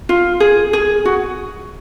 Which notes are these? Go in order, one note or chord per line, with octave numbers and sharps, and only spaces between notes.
F4
G#4
G#4
F#4